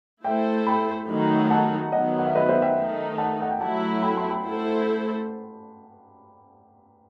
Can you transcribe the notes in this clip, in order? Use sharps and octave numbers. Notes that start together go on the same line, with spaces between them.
A3 E4 A4 C5 E5 G5
G5 B5
D#3 F#3 A3 D#4 F#4
F#5 A5
D#3 F#3 B3 D#5 F#5
F#5
E5
B4 D#5
C5 E5
E5 G5
D#3 A3 D#4
F#5 A5
F#5
G5
F#3 A3 E4 F#5 A5
G5 B5
A5 C6
G5 B5
A3 E4 A4 C5